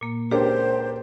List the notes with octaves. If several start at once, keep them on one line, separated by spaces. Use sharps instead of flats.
A#2 A#3
C#2 D4 G4 G#4 A#4 C5 C#5